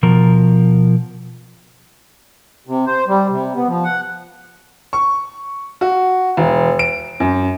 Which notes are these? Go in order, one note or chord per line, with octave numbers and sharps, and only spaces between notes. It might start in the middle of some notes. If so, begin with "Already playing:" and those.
B2 F3 A#4
C3
C5
G3
C3
B3
F3
F#5
C#6
F#4
E1
D7
F#2